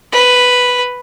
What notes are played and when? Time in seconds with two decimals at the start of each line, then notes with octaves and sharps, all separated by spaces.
0.12 B4